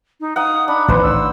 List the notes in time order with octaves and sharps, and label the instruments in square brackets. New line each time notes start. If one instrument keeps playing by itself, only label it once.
[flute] D#4
[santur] D#4 F5 F#5 [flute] D#6
[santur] D4 [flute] B5
[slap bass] A1 D#3 [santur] B4 C5 [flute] B5
[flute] E6